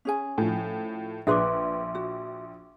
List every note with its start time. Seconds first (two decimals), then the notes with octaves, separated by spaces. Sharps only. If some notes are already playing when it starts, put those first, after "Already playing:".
0.05 C#4 G#4 G#5
0.38 A2 F3
1.27 A#1 G#4 B4 D5 E5 C6 D6
1.95 F#4